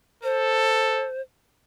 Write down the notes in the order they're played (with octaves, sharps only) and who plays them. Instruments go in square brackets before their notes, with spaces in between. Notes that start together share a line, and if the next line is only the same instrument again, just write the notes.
[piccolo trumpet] A4 [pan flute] C5